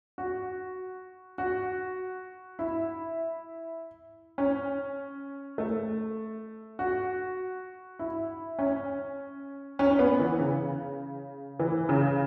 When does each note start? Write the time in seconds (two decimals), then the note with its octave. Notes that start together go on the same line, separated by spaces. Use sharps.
0.18 F#4
1.38 F#4
2.59 E4
4.38 C#4
5.58 A3
6.79 F#4
7.99 E4
8.59 C#4
9.79 C#4
9.91 C#4
9.99 B3
10.20 E3
10.39 C#3
11.59 E3
11.89 C#3